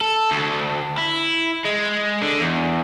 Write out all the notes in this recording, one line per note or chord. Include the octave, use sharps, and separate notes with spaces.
A4
D2
E4
G#3
D3
E2